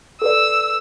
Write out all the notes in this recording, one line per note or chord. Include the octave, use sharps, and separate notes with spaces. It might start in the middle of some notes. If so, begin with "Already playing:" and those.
A4 B4 D5 E6